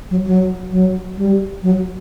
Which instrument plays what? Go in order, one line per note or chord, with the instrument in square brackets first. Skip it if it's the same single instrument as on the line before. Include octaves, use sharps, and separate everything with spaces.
[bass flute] F#3
F#3
F#3
G3
F#3